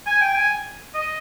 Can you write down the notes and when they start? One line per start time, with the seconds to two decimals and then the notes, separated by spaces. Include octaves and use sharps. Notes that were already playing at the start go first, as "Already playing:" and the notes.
0.07 G#5
0.21 G5
0.35 G#5
0.94 D#5